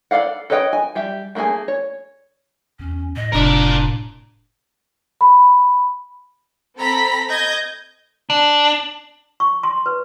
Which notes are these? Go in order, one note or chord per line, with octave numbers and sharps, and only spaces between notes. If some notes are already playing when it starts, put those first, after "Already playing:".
A4 C5 D5 F5 F#5
A4 B4 C#5 D#5 G5
G#5
G3 G4 E5
F#3 A3 A#3 G#4 G#5
C#5
E2 C#4
A2 D#5
F1 D4 A#4 D5
B5
C4 A4 A#5 B5 B6
D#5 G6 G#6 A#6
D4
C#6
C6
B4